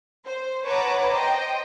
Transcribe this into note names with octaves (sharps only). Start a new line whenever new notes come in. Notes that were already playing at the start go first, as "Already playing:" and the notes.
C5
B4 C#5 F#5 A5 A#5 D6
C5 D#5 G5